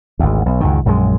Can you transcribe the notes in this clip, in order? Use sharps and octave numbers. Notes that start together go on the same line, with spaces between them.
G#1 D2
B1
C#2 F#2 D#3
A#1 F#2 D3 G#3